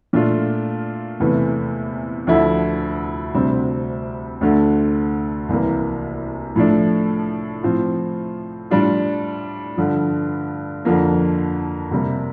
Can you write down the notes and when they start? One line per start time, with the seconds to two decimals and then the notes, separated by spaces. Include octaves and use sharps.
0.13 A#2 A3 D4 F4
1.20 E2 C3 E3 A3
2.27 D2 D3 F3 A3 E4
3.34 D2 C3 G3 C4
4.41 D2 D3 A3
5.49 C2 C3 E3 A#3
6.56 A2 F3 A3 D4
7.63 A2 F3 C4 F4
8.71 A2 G3 D4 F4
9.77 G2 D3 F3
10.85 F2 D3 F3 A#3
11.91 C3 G3 A#3